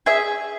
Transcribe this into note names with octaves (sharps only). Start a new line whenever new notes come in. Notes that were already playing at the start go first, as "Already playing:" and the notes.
G#4 E5